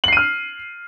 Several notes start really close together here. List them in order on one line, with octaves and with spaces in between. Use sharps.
F#7 C7 D#7 F6